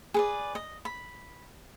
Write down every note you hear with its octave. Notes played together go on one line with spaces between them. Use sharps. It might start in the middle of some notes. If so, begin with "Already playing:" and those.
G#4 B4 D5
D#5
B5